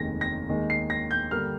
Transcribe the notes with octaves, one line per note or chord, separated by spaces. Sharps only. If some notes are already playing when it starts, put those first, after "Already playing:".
Already playing: F1 D#2 D#3 G#3 A#6
A#6
D#2 D#3 G#3
C7
A#6
G6
G2 D3 G3 A#3 F6